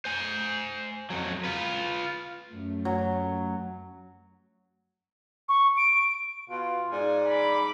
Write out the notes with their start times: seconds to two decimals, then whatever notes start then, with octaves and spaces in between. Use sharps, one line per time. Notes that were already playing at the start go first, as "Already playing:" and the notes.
0.05 C5 G#5
1.10 F2 F#3
1.44 F4 B4
2.50 F#2 A3
2.85 F#3
5.49 C#6
5.77 D7
6.49 B2 F4
6.92 G#2 D5 G#5
7.28 B5 D6